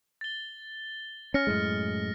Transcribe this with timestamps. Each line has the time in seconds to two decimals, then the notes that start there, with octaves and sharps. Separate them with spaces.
0.21 A6 G7
1.34 C#4 F6 A#6 C#7
1.47 F#2 A2 G#3